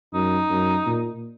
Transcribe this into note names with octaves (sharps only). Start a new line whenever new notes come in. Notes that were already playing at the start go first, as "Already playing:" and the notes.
F#2 D#4
F#2
A#2